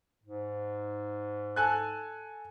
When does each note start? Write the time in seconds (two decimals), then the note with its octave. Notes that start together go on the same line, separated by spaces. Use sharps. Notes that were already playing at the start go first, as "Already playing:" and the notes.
0.24 G#2
1.56 A4 G#5 F#6